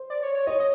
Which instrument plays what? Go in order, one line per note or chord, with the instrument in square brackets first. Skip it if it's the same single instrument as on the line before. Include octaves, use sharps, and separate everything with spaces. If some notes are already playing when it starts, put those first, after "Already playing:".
Already playing: [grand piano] C5
[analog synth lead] D5
C#5
C#5
[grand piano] C#5 [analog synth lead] D#5
[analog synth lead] D#5